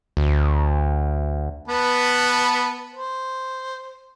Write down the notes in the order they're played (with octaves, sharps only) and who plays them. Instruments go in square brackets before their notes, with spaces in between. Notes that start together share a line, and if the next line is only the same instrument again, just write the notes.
[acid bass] D2
[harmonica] B3 B4 A5
C5